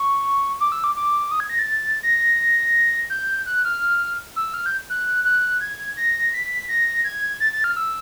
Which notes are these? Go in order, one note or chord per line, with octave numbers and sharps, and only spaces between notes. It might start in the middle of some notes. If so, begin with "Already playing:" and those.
Already playing: C#6
D6
E6
D6
D6
D#6
G#6
A#6
A6
A#6
G6
F#6
F6
E6
F6
G6
F#6
F#6
G#6
A#6
B6
A#6
G#6
A6
A6
F6
E6